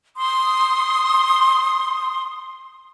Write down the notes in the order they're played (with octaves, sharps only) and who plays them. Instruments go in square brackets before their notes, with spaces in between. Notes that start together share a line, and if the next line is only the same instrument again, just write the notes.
[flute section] C6 D#6